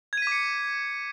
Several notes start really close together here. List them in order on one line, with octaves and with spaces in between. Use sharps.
G#6 D#7 B6 D6 C#7